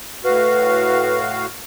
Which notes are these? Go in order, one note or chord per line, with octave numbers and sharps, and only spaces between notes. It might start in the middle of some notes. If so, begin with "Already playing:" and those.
A2 F#4 B4 F5